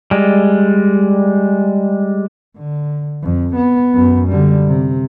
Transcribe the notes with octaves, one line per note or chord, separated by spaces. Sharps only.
G3 G#3
D3
F2
B3
F#2 B3
D3 G3
C3